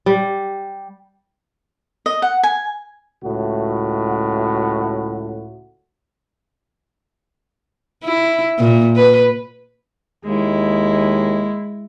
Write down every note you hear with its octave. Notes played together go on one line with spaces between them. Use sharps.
G3
D#5
F#5
G#5
C#2 A2 F#4
E4
A#2
B4
D#2 G#3 E4